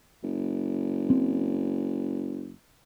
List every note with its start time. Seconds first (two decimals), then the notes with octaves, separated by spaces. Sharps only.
0.23 F#1
1.10 C4